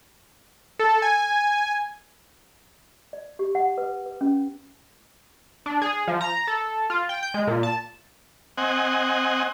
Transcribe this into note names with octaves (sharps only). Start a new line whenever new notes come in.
A4
G#5
D5
G4
F#5
B4
B4
C#4
D4
G#4
F3
A#5
A4
F4
G5
G6
G#3
A#2
A5
C4 D#5 F#5 G#5